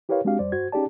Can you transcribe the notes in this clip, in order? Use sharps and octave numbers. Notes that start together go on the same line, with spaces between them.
E4 G4 A#4 B4 C#5 F5
G#3 C4 D4 F#4 G4 F5
F2 G3 C5 D5
G2 F#4 C5 G#6
C#4 D#4 G4 G#4 D5 A5